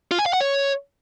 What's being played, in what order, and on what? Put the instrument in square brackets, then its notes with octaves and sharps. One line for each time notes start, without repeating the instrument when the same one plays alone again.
[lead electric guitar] F4
G#5
F5
F#5
C#5